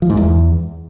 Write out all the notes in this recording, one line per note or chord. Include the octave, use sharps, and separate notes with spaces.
F3
G#2
E2